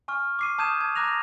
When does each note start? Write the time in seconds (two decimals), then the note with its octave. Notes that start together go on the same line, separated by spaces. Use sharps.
0.08 G#5 C#6 F6
0.39 D6 C7 D#7
0.58 A5 D#6 G6 G#6 D#7 E7
0.80 A5 G#6
0.96 A#5 D6 F#6 A#6 F7